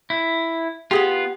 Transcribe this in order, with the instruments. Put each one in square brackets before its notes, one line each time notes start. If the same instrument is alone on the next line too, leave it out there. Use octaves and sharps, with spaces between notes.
[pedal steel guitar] E4
[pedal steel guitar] B3 F4 [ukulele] G4 G#4 F#5